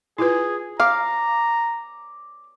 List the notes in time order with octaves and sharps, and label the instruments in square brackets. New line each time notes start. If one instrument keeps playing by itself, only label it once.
[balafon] E4 F4 B4 [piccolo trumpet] G#4
[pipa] F5 [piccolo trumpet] A#5 [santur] D6